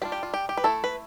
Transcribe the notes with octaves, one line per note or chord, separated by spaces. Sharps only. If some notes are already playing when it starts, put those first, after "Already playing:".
G3 D4 F4 G4
G4
F4
G4
G4
B4
A3 E4 A4
B4